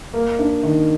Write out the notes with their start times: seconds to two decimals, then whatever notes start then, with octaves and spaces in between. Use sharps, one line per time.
0.14 A#3
0.39 D4
0.63 D#3